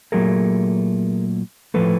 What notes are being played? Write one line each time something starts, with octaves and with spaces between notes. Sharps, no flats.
A#2 F#3 A3 G#4 A#4
A2 F3 A3 A4 B4